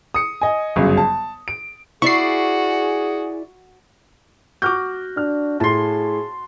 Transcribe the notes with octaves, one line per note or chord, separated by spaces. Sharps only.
D#6 C#7
D#5 G#5
G1 F#2 C#3 F#3
A5
D7
E4 F#4 G#4 D5 C#6 C7
F#4 D6 F6 G6
D4 F6
A2 G#4 A5 C6